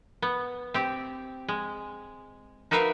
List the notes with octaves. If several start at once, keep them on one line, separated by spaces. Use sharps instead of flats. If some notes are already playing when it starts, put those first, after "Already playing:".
B3
C4 G4
G#3
D#4 F#4 A#4 B4 E5 F5